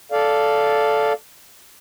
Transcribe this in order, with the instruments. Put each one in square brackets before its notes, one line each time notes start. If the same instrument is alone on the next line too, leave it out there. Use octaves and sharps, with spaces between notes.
[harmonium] A4 D5 F5